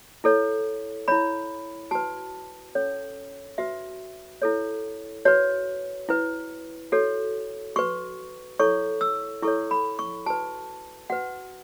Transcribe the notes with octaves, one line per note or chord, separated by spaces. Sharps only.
E4 A4 C#5
E4 C#5 B5
F#4 B4 A5
C#4 A4 C#5
F#4 B4 E5
E4 A4 C#5
F#4 B4 C#5
E4 B4
F#4 A4 C#5
F#4 B4 C#6
E4 A4 C#5 C#6
E6
E4 A4 C#5 C#6
B5
C#6
F#4 B4 A5
F#4 B4 F#5